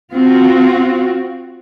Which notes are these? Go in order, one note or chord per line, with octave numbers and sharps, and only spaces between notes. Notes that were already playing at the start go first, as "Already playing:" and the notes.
C4 F4 F#4